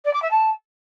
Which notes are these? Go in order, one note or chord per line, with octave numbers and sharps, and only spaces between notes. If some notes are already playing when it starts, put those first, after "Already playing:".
D5
D6
E5
A5